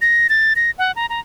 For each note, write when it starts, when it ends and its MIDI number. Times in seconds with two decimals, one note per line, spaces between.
0.01 0.27 94
0.29 0.53 93
0.56 0.71 94
0.78 0.92 78
0.96 1.06 82
1.10 1.20 82